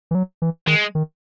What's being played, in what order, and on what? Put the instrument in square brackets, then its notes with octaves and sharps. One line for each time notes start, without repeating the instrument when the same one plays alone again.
[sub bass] E3
F#3
E3
[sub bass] D#3 [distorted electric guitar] G#3
[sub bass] D#3